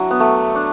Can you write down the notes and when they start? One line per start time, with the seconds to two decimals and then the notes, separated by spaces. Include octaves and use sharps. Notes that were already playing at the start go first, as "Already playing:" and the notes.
Already playing: F#3 D4 E4
0.10 B3
0.20 A3
0.55 D4